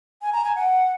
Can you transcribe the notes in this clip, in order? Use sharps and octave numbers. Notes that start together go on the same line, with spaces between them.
G#5
A#5
G#5
F#5